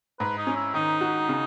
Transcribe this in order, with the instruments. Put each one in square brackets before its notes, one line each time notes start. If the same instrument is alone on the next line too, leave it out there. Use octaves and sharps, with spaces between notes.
[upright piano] G#2 [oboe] B4
[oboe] D#4
[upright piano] C#4
[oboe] E4
[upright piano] D#3 [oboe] D#4
[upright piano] F#4
C#3